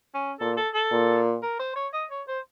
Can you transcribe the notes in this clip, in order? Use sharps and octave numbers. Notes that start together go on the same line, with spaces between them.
C#4
A#2 A4
A4
A4
A#2
A#4
C5
C#5
D#5
C#5
C5